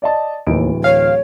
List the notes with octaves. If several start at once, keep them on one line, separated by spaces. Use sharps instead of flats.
D5 D#5 A5
D1 D#2 E3 D7
C#5 F5